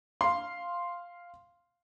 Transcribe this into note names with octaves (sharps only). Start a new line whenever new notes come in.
F5 C6